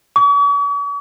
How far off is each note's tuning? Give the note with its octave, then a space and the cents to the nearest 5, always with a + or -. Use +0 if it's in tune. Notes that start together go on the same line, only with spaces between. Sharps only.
C#6 +45